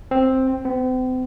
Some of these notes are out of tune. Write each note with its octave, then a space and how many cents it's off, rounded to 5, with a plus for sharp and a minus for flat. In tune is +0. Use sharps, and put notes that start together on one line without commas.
C4 +5
C4 -40